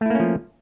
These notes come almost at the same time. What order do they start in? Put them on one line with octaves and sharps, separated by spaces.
A3 E4 A#3 C#4 F3